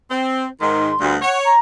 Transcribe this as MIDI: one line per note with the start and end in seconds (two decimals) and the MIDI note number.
0.10 0.46 60
0.61 0.90 44
0.61 0.90 51
0.61 1.08 84
1.00 1.16 38
1.00 1.16 43
1.22 1.51 73
1.22 1.38 78
1.44 1.59 82